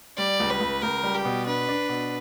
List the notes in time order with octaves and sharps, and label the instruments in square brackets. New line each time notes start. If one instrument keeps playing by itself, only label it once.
[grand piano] G3 [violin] D5
[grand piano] C#2
[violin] B4
[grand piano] C#2
[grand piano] C#2 [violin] A#4
[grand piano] G3
[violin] G4
[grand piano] B2
[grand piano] D4 [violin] B4
[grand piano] D4
B2